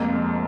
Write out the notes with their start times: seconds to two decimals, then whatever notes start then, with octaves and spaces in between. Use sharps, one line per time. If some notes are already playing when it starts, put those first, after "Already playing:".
Already playing: F1 F2 G#3 A#3